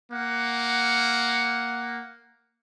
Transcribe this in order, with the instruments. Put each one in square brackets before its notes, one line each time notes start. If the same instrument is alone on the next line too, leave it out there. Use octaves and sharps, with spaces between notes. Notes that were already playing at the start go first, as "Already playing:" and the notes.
[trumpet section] A#3 F#5